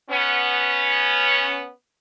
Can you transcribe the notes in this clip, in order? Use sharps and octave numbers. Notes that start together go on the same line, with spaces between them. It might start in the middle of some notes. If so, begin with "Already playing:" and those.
B3 C#4